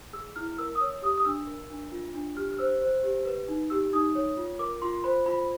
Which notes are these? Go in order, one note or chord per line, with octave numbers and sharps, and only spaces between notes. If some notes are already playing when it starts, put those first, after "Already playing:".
G#4 E6
E4 F6
A#4 E6
D#6
C#5 E6
G4 D#6
D#6
D4 E6
A#4
D4
F4
D4
G4 F6
F6
C5 E6
C5
G4
B4
D#4
G4 E6
D#4 D#6
C#5
F4
A#4 D6
F4 C6
C5 B5
F4 B5